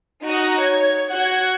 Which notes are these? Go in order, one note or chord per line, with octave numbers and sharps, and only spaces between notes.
D#4 F#4 D#5 A#5
C#5 G#6
F#4 F#5 G#6